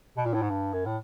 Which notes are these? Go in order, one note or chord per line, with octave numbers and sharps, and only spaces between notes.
B2
A#2
A2
G#2
G2
F#2
A2